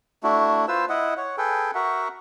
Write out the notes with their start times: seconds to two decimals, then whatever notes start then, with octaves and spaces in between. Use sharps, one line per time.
0.23 A3 D4 E4 F#4
0.68 F4 B4 C5 E6
0.89 E4 D#5 F#5
1.17 C#5 F#5
1.38 G#4 A4 B4 G5
1.75 F#4 A#4 E5 F#5